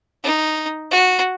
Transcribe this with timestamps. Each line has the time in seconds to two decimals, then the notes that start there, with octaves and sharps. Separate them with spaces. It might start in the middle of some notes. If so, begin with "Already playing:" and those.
0.24 D#4
0.91 F#4